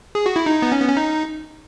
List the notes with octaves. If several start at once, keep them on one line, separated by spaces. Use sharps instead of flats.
G#4
F#4
E4
D#4
B3
C#4
B3
C#4
D#4